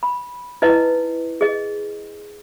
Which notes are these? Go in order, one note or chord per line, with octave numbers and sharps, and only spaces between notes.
B5
D#4 E4 B4 D#5
G#4 D#5